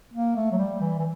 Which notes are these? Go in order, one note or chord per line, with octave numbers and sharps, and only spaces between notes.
A#3
A3
F#3
G3
E3
E3